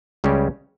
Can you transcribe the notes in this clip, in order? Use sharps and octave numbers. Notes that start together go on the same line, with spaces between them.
C#2 C#3 G3 C#4 G4